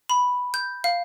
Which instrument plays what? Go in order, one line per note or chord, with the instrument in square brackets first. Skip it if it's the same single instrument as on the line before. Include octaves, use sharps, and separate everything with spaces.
[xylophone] B5
G6
F5